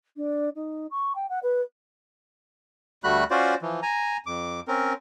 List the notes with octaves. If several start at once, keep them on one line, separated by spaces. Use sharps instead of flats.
D4
D#4
C#6
G5
F#5
B4
D2 G3 A3 F#4 B5 F#6
C#4 F4 F#4 C5 D5
E3 F3
G#5 A#5
F2 D6
C4 C#4 A#4